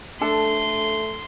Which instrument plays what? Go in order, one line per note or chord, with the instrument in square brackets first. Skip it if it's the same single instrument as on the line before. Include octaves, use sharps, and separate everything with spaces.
[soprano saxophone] A3 [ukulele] D4 A4 A5 [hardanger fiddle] C6